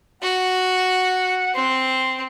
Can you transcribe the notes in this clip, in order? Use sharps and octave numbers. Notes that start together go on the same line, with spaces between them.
F#4 F#5
C4 C6